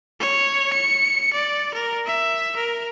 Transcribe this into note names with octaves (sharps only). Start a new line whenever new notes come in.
C#5
C#7
D5
A#4
E5
A#4